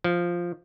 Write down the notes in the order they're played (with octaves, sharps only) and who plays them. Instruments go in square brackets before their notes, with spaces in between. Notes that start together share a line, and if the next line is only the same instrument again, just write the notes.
[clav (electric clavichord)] F3